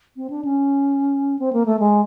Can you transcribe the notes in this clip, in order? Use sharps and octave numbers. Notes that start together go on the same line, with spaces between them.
C4
D4
C#4
C4
A#3
A3
G#3